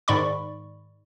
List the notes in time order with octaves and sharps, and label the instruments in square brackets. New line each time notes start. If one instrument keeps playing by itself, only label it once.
[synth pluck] G#2 D#3 D5 B5 C#6